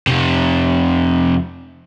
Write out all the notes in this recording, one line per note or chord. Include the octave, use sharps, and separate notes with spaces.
F2 C3